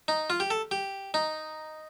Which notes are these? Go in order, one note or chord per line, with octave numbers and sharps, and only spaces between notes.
D#4
F4
G4
A4
G4
D#4